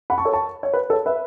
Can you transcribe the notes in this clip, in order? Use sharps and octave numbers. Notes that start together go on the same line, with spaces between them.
F#5 B5
A5 C#6
A4 C#5
A5 C#6
C#5
B4
A4 C#5
B4 E5